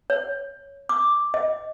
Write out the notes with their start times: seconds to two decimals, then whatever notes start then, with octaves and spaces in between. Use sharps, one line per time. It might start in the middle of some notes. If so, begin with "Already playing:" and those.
0.10 C#5
0.89 D6
1.34 D#5